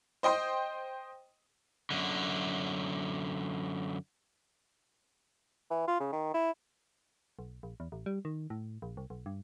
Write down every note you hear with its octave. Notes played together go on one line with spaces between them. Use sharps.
C5 D#5 G5 C6
F#2 D3
E3
F4
C#3
D#3
E4
B1
A#1
E2
A1
G3
D#3
A2
A#1
C2
B1
G2